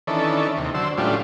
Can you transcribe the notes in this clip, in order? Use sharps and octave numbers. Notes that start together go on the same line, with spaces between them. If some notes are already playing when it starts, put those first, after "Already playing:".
D#3 E3 C#4 D4 A4
D#2 C3
D3 F#3 C5 E6
A2 F#3 G3 C#4 D4 F4